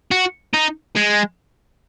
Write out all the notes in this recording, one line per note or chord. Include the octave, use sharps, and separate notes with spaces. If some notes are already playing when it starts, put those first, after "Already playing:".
F#4
D#4
G#3